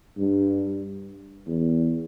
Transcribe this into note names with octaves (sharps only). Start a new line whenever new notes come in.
G2
E2